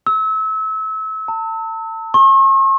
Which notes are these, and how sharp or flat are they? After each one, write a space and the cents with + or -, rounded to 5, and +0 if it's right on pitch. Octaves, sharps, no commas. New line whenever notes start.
E6 -30
A5 +35
C#6 -45